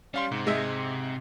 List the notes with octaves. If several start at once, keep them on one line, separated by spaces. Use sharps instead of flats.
G3 C#4 F5 C6
G#2 C3
G#3 D#5 E5